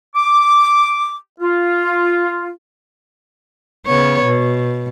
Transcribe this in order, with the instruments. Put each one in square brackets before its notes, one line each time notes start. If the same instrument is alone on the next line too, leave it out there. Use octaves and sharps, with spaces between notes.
[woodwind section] D6
F4
[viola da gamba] C#3 B3 C#5
B2